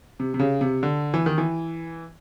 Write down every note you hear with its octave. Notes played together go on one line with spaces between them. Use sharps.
C3
C3
C#3
C3
D3
E3
D#3
E3